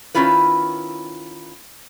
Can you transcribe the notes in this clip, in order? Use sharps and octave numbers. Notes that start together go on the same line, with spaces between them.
D#3 C#4 E4 F4 B4